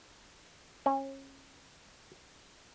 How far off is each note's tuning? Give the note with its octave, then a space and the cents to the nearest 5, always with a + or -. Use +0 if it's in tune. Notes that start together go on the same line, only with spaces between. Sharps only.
C#4 -30